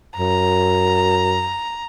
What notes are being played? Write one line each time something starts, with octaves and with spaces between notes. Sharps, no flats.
F#2 A#5